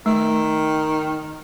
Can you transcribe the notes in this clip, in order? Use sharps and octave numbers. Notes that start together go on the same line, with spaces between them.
D#3 A3